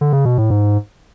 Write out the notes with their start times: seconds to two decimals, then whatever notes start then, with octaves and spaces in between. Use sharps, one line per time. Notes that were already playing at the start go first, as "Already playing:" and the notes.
0.01 D3
0.13 C#3
0.25 B2
0.38 A2
0.50 G#2